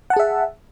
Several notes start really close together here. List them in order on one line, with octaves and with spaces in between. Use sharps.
F#5 A5 G#4 E5